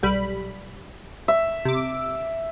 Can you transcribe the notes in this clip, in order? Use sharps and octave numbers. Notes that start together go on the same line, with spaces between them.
B1 G3 B5
E5
C3 D6